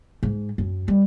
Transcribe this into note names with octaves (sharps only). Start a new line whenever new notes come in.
G#2
F#2
G3